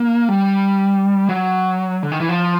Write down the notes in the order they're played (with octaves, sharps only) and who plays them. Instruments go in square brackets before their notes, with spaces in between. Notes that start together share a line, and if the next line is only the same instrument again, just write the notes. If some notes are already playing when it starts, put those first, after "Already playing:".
Already playing: [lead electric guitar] A#3
G3
F#3
D3
D#3
E3
F3